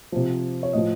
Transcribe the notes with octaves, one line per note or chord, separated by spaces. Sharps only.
C3 F3
C#5
A2 F3 D#5